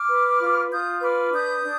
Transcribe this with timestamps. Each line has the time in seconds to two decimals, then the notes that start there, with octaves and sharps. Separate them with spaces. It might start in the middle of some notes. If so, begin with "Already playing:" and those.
Already playing: D6 F6
0.09 B4
0.40 F4
0.71 F4 D#6 G6
1.02 B4 D6 F6
1.33 D4 D#6 G6
1.64 D4